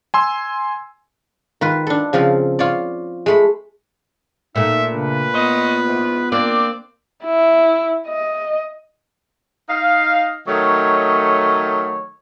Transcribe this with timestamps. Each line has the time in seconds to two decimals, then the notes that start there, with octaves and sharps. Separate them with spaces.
0.14 G#5 C6 E6
1.61 D#3 F4 B4
1.87 D4 A4
2.13 C#3 F3 C4 F4
2.59 F4 C#5 D5
3.26 G#3 A3 B5
4.56 A#2 A3 D#4 E5
4.92 C#3 D4 B4
5.35 B3 F4 C5 C#5 D#5
5.86 E2 G#2
6.32 A#3 C4 D4 D5
7.24 E4
8.07 D#5
9.69 D#4 D#5 F5
10.48 D#3 F#3 A3 C#5 D#5